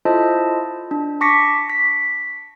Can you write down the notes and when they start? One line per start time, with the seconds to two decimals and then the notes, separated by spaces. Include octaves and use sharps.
0.05 E4 F4 A4 C5 D#5 A5
0.91 D4
1.21 A5 C#6 D6 A#6 B6 C#7
1.70 B6